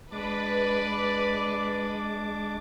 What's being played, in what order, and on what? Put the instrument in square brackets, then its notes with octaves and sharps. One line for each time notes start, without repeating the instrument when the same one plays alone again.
[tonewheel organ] G#3 D6 [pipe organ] D4 [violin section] B4 [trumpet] D5